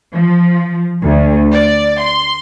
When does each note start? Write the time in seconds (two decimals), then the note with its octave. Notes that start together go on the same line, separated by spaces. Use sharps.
0.13 F3
1.03 D2
1.53 D5
2.00 C6